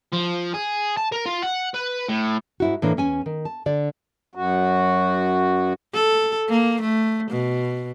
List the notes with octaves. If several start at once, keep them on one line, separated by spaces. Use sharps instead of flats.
F3
G#4
A5
A#4
F4
F#5
B4
A2
G#2 E4 F#4
A2 E3 A#3 D4
E2 C#4 G#5
D#3
A5
D3 D5
F#2 F#4
A4
A#3
A3
B2